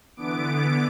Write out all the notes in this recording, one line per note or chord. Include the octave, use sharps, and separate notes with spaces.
D3 E3 B3 D6 D7